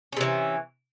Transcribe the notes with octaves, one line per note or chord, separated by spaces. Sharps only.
C3 E3 C#4